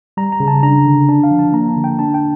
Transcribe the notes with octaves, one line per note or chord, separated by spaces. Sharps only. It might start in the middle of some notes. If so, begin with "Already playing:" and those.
G3 A#5
A#5
C#3
A5
D4 A#5
D3
D4 A5
F5
F3
A5
A#3 A#5
A5
D3
G5
D4 A5
G5